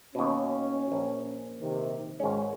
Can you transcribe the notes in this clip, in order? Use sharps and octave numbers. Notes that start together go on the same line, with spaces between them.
D#2 B2 C#4
A#1
C3 D#3
G#1 G#3 C#4